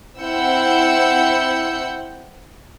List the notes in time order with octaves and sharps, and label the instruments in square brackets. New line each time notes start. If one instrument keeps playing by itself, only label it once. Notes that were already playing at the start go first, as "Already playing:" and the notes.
[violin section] C4 E4 F#5 E6 G6 C#7